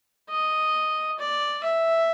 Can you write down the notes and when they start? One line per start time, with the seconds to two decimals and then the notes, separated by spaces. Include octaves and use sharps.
0.29 D#5
1.19 D5
1.64 E5